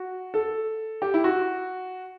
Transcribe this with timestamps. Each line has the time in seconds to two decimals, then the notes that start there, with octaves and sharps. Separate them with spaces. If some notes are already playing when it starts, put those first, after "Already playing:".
Already playing: F#4
0.34 A4
1.02 G4
1.14 E4
1.24 F#4